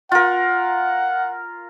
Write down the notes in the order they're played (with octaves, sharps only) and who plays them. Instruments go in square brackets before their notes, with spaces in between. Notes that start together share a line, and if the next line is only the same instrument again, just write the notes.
[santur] F4 A#4 [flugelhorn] F#5